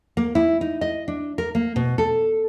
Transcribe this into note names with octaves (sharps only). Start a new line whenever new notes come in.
A#3
E4
D#4
D#5
D4
A#4
A#3
B2
A4